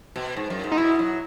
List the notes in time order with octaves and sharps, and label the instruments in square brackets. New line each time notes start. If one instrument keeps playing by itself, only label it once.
[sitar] B2
G#2
F#2
G#2
[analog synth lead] D#4
[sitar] B2 [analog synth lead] E4
[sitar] F#3